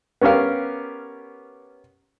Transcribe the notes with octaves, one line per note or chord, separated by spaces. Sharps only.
B3 C#4 G4 A#4 F5